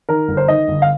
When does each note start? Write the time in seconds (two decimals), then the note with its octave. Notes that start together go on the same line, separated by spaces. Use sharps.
0.09 D#3 A#4
0.28 G1
0.37 C5
0.48 D#3 D#5
0.68 G1
0.82 F5